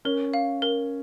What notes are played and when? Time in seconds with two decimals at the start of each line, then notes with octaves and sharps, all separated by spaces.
0.05 C#4 A#4
0.34 F5
0.62 A#4